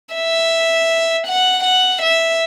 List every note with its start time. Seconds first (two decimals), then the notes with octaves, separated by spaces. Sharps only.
0.15 E5
1.27 F#5
1.64 F#5
2.02 E5